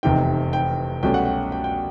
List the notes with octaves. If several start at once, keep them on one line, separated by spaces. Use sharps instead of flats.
F1 E2 C3 D#3 G5
G5
C2 B2 F#3 A3 C#4 G5
F#5
G5
G5
G5